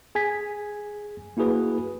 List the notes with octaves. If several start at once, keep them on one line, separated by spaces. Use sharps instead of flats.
G#4 G#5 G#6 B6
A#3 E4 F#4 G#4 B4